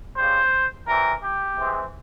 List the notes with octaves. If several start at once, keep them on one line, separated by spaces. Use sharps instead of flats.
C#3 G3 C4 C5
E3 G3 C4 A#4
G4
E3 G#3 C4